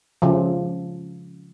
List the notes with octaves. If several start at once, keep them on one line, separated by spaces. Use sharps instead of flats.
C#3 F3